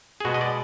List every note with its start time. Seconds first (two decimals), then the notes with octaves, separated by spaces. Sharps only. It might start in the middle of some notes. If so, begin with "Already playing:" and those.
0.20 G#4
0.25 B2 G#3 B3 F#4
0.34 D#5
0.41 D5